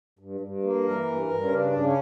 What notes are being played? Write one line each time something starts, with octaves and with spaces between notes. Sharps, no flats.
G2
G2
A#3
E3 A#4
G2
G2
C#4
C#3 D4
C#3
C#4